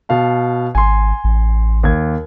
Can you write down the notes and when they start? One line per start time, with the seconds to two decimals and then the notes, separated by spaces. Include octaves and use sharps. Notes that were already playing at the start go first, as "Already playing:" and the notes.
0.09 B2 F5 A5
0.75 G#1 G#5 C6
1.24 A1
1.83 D#2 G#6